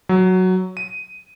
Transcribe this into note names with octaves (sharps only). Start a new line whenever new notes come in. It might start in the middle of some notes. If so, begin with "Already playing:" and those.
F#3
D#7